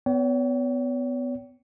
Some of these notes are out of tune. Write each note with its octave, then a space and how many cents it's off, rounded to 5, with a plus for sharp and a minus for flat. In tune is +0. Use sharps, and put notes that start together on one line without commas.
B3 +25 C#5 +40 G5 -30